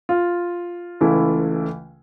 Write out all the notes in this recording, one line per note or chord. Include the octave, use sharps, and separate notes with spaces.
F4
C#2 C#3 E3 A3 E4